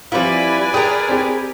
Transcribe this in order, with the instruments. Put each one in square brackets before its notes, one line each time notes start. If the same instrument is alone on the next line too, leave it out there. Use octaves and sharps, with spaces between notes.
[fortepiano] F3 C4 F4 [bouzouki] G3 E4 [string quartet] B4 D5 G#5
[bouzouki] G#4 A#4 [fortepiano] G5 D#6
[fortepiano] C4 G4